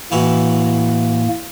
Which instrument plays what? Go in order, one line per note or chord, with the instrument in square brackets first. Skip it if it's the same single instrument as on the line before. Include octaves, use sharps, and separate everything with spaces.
[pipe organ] A2 A#3 [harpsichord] E3 E4 F#4